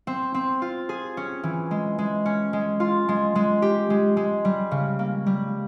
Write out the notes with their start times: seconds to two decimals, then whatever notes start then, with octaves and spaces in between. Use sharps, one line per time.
0.07 C4
0.34 C4
0.62 F4
0.89 G#4
1.17 C#4
1.43 E3
1.71 G#3
1.99 G#3
2.26 C#4
2.53 G#3
2.80 F4
3.09 G#3
3.35 G#3
3.62 G4
3.90 G#3
4.17 G#3
4.45 G3
4.71 C#3
4.99 A#3
5.27 G3